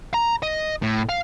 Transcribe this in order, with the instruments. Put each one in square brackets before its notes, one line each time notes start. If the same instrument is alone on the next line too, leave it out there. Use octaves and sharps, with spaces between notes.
[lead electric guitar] A#5
D#5
A2
F5